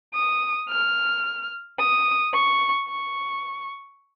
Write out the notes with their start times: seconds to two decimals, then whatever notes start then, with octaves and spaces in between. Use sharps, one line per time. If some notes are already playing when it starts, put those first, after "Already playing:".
0.14 D#6
0.69 F6
1.78 D#6
2.34 C#6
2.88 C#6